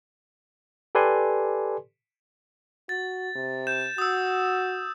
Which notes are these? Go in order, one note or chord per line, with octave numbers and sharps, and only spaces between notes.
G4 A4 B4 D5 G#5 C6
F#4 A6
C3
G6 E7
F#4 D#6 E6